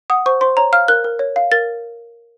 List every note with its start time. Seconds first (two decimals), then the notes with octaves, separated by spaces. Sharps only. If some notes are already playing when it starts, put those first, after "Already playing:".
0.10 F#5 D#6
0.26 C5 C#6
0.41 C5 C6
0.57 C#5 A#5
0.73 F5 F6
0.88 A#4 F#6
1.04 A#4
1.19 C#5
1.36 F5
1.52 A#4 A6